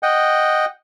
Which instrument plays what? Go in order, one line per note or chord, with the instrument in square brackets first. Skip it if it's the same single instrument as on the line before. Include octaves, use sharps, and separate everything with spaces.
[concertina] D#5 F#5 G5